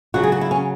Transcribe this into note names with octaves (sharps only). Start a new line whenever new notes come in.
C#3 F#3 F#4
G#4
F#4
E4
C#4